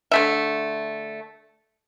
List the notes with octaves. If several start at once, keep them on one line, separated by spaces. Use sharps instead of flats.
D3 A3 E5